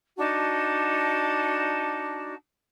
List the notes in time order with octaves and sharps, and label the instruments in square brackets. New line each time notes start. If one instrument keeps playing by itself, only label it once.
[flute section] D4 D#4 F#4 A5